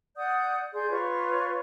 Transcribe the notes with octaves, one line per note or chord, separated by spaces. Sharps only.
D5 F#5 D#6 G6
G#4 D5 C6 G6
F4 B4 C#5 C#6